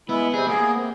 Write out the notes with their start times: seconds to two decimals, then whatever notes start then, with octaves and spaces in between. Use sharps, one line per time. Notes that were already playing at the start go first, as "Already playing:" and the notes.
0.09 G#3 B3 E4
0.33 C3 G3 C4 G#4
0.47 A#3 B3 G#4
0.73 C3